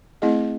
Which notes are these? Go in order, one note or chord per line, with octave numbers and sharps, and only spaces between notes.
A3 C4 E4 G#4 D#5